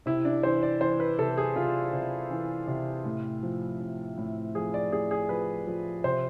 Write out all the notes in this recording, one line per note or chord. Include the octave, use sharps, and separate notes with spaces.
C3 E4
D4
E3 C5
D5
E3 C5
B4
C3 A4
G#4
C3 F4
C3
E3
C3
A2
F3
A2
A2
F3 G#4
D5
A2 G#4
G#4
F3 B4
F3
C3 C5